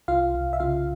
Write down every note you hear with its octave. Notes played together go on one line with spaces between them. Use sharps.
C2 F4 F5
C2
E5
C#3 F4 F5